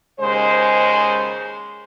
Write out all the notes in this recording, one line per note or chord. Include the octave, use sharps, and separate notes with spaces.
D#2 C#3 G#3 C5